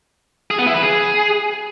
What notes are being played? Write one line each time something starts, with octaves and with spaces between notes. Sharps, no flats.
G#4
B3
E4
B4
G#4